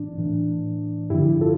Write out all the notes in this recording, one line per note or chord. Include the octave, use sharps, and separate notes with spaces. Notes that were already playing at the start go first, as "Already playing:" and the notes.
Already playing: A2 E3 D4
A2 E3
G2 D3 F3 E4 G4
F4 A4